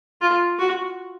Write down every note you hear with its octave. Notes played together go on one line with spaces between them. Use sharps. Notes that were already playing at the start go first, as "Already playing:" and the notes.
F4
F#4